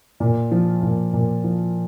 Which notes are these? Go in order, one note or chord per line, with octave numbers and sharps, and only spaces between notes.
A#2
F3
A#2
A#2
F3